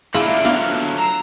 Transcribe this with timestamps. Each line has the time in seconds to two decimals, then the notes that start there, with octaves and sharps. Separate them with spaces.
0.14 D3 A#3 E4 F4 G#4
0.45 D3 F#3 B3 D4 F4 F5
0.99 A#5 E6 C7